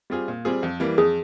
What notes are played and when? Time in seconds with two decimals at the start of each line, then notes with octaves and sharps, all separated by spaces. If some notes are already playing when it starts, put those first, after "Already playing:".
0.10 G3 C4 F4 G#4
0.28 A#2
0.45 G3 C4 F4 G#4
0.63 F2
0.80 E3 G3 A#3
0.98 F2 G#4